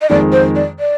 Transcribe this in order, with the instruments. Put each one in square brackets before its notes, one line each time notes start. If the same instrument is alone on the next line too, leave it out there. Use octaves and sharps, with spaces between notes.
[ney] D#5
[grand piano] F2 D#3 G#3 [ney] D5
[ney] C5
D5
D5